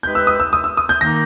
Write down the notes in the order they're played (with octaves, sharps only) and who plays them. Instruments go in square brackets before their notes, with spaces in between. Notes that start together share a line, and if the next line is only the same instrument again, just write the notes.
[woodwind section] G#3 D#4 G4 B4 [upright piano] G6
[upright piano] E6
D#6
E6
D#6
E6
D#6
G6
[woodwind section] D#3 A#3 D#4 [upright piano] A#6